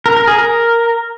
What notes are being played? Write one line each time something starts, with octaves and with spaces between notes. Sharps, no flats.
A#4
A#4
G#4
A#4